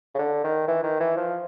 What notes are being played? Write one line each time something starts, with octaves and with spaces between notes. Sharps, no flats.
C#3
D3
D#3
E3
D#3
E3
F3